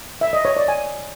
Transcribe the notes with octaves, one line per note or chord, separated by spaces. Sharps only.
E5
D#5
C#5
D5
G#5